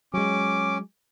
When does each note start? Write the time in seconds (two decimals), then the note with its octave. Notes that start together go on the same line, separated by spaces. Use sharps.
0.14 F#3 G#3 C#4 D6